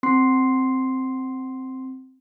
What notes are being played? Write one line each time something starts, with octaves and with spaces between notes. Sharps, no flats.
C4 C6 C7